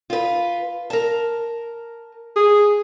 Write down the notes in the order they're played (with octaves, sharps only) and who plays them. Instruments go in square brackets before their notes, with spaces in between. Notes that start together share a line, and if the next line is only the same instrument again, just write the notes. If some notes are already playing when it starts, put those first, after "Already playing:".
[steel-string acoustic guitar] F4 B4
A#4 A5
[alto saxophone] G#4